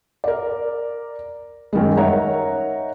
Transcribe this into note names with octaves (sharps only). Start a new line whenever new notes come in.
A#4 D5
F#2 D#3 G3 G#3
D#4 A#4 C#5 E5 F#5 A#5